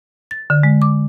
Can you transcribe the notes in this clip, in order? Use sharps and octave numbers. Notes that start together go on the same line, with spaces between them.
A6
D3
G#3
D6